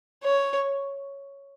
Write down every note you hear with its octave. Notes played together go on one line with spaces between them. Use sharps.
C#5